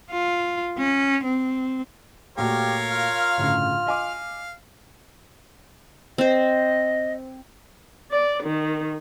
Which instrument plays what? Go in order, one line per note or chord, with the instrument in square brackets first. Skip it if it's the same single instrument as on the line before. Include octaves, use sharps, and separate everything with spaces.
[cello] F4
C#4
C4
[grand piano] A#2 A3 F#4 [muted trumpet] G4 [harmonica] A#4 C#5 F5
[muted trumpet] F4 [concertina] F6
[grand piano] G1 A2 C#3
[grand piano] D#5 G#5 D6 [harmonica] F5
[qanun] C4 C5 [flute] D#5
[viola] D5
D#3